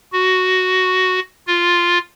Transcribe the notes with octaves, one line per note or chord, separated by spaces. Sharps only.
F#4
F4